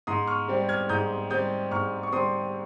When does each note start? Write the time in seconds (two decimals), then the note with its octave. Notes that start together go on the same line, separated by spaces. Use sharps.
0.07 G#2 C6 D#6
0.27 C#6 F6
0.48 G3 C4
0.69 F6 G#6
0.89 G#2 D#6 G6
1.30 G3 C4 D#6 G6
1.71 G#2 C#6 F6
2.03 C#6
2.13 G3 C4 C6 D#6